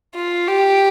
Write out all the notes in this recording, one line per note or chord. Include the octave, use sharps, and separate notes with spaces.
F4
G4